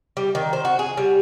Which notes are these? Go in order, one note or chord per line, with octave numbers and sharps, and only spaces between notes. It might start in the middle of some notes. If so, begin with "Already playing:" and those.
G3
D#3
C5
F#4
G#4
G3